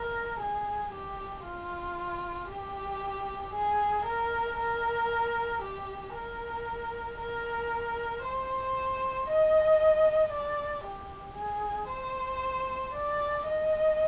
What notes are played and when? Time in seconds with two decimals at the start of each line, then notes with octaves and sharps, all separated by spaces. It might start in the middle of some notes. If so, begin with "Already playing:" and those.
Already playing: A#4
0.39 G#4
0.92 G4
1.44 F4
2.49 G4
3.53 G#4
4.05 A#4
4.58 A#4
5.62 G4
6.14 A#4
7.19 A#4
8.23 C5
9.28 D#5
10.31 D5
10.84 G4
11.36 G#4
11.89 C5
12.93 D5
13.45 D#5